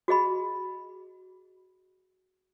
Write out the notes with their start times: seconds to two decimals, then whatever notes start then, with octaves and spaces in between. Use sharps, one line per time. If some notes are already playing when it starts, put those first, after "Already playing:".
0.08 F#4 G#4 D#5 B5